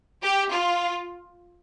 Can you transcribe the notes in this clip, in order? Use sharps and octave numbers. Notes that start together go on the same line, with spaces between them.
G4
F4